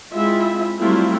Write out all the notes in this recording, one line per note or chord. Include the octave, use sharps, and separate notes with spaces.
G#3 C4 E4 F4 E5
F#3 G3 A3 C4 E4 F4